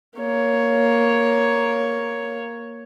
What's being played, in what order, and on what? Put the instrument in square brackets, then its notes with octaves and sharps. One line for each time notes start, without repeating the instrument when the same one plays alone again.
[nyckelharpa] A#3 C#5